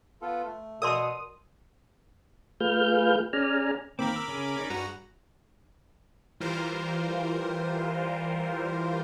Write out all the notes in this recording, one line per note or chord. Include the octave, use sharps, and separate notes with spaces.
B3 F4 A4
A3
B2 A#4 D5 C6 D#6
A3 F4 G#4 B4 F6 G6
C#4 G#4 D5 G#5 A#5 F6
D#3 A#3 C4 A#4 B5 D6
E6
C#3 C#4 G#4
C#4 D#4 D5
G2 F#4 G#4 B4 A#5
E3 G3 F4 A#4 C5